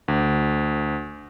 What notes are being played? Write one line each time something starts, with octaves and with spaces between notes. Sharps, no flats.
D2